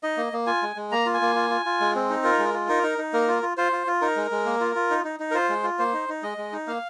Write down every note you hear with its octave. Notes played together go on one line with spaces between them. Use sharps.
D#4 D#5
A#3
A#3
F4 G#5
G#3
G#3
A#3 A#5
F4
G#5
A#3
F4
F4
F4
G#3
C4
D#4
F4 A#4
G#3
F4
D#4 A#4
D#4
D#4
A#3 A#4
F4
F4
F4 C5
F4
F4
D#4 A#4
G#3
G#3
A#3
F4
F4
D#4
D#4
D#4
A#4
F4 C5
G#3
F4
A#3 C5
D#4
D#4
G#3 D#5
G#3
D#4
A#3 F5